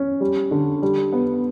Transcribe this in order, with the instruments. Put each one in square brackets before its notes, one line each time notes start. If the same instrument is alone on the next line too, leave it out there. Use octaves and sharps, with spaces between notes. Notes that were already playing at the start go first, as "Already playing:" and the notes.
Already playing: [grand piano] C#4
G3
D3
G3
B3